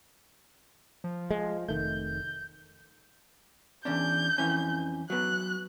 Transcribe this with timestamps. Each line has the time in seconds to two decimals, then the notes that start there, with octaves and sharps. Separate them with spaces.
1.04 F3
1.31 G#3
1.68 F1 D#3 A3 G6
3.85 E2 C#4 D4 G6
4.38 F2 E3 C#4
5.10 F#3 B3 F#6